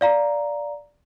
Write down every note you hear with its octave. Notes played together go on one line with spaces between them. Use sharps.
D5 F5 A#5